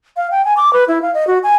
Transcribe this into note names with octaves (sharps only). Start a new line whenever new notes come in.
F5
G5
G#5
D6
B4
E4
F5
D#5
F#4
G#5